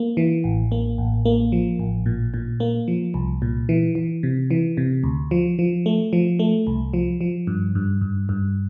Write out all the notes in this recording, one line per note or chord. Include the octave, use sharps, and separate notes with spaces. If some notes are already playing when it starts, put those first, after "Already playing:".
Already playing: A#3
E3
A1
A#3
A1
A#3
F3
A1
A#2
A#2
A#3
F3
C2
A#2
E3
E3
C3
E3
C3
D2
F3
F3
A3
F3
A3
C2
F3
F3
G2
G2
G2
G2